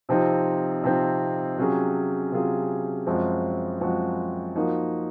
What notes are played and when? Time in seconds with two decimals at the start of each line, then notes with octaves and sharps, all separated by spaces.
0.09 C3 F3 C4 D#4
0.84 C3 F3 C4 D#4
1.58 C3 F#3 C#4 F4 G#4
2.32 C3 F#3 C#4 F4 G#4
3.06 F#2 F3 G#3 C4 F#4
3.81 F#2 F3 G#3 C4 F#4
4.55 F3 A#3 D#4 F#4